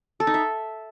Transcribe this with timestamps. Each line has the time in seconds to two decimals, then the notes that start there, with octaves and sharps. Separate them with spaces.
0.20 A4
0.27 D#4
0.34 E5